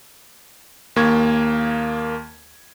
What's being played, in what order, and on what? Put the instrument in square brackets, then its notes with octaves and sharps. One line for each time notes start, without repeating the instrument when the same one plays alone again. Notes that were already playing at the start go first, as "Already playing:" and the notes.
[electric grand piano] D#2 A#3 C#6 G#6